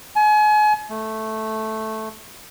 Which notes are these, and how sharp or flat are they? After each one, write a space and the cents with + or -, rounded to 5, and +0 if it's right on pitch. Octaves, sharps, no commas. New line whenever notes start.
G#5 +35
A3 -5